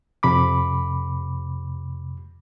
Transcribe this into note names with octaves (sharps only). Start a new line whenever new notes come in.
F2 C3 B5 D6